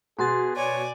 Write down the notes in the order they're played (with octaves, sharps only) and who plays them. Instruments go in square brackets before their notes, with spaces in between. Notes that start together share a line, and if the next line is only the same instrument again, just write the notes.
[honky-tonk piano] B2 [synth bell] F#4 C6 A6 [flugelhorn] G#4
[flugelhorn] C#5 [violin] D5 G#5